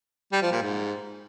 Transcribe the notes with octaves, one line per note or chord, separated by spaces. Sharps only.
G3
F3
A#2
G#2